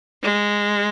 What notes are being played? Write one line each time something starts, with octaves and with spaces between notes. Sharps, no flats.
G#3